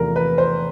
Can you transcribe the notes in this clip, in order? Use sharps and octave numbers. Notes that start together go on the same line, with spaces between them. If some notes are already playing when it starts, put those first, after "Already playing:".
Already playing: E2 C3 F3 A3 A#4
B4
C5